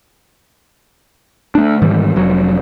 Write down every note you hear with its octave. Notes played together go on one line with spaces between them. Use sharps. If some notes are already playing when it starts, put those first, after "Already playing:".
A3 D4
G#2 D#3 E3 G3
F1 F#3